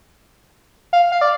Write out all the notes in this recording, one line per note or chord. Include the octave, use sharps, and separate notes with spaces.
F5
F5
D5